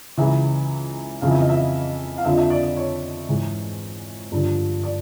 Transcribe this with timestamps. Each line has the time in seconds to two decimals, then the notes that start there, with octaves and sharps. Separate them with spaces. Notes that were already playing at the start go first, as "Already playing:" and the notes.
0.17 C#2 C#3 E3 E5
1.21 F2 C#3 E3 F5
1.31 E5
1.41 D#5
1.49 E5
2.18 F5
2.25 F2 D3 F3 E5
2.34 D#5
2.38 E5
2.50 D5
2.63 D5
2.77 C#5
3.29 G#2 E3
4.32 G2 D3 F3
4.84 D5